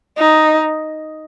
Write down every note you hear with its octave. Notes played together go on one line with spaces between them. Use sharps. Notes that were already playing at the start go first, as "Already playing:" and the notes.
D#4